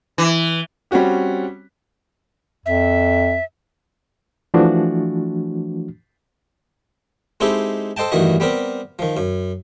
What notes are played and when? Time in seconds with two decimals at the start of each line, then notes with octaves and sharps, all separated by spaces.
0.18 E3
0.91 G3 C4 C#4 F#4 G4
2.66 F2 E5
4.54 E3 F3 A3 D4 F#4
7.40 G#3 C4 D#4 E4 G4 A4
7.97 A4 C5 D#5 G5 A5
8.12 A1 G2 D#3 E3 F#4 D#5
8.40 G3 B3 C4 G4 A#4
8.99 D#3 F3
9.17 F#2